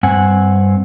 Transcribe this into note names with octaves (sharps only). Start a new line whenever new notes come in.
G2 C4 F#5 G#5